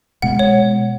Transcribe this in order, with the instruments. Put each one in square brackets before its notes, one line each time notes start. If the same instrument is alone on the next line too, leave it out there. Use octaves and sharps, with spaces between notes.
[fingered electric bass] B2 G#3 B3 [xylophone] F#5
[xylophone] C#5